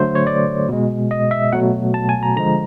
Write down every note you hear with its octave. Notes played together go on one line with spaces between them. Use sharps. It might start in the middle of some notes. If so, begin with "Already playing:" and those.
Already playing: D3 F#3 A3 C5
C#5
D5
B2 G#3
D#5
E5
B2 F#3 A3 F#5
A5
G#5
A#5
D3 F3 G#3 A#5